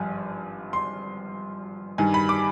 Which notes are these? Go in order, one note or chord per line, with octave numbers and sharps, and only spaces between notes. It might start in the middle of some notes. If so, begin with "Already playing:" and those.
Already playing: G#1 G2 F3 G#5
C6
G2 D#3 G3 G#5
B5
D6